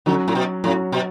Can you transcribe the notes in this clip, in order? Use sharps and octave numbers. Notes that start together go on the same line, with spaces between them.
D3 F#3 C#4 F#4
A2
B2
A2 F#3 C#4 F#4
B2